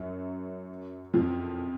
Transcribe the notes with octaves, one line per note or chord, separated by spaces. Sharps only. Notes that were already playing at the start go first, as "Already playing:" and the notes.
Already playing: F#2 F#3
F2 F3